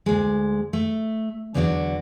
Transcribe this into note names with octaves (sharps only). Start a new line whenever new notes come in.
D2 G#3
A3
E2 D3 F#3 D4 F4 F#4